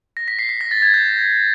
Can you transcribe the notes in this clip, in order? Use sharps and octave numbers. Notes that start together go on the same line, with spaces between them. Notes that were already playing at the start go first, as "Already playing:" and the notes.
A#6
B6
C7
B6
A#6
A6
G#6
G6